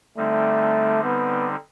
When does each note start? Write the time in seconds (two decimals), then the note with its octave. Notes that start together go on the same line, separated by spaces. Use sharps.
0.17 D3 G3 A3 C4 D#4
1.03 B3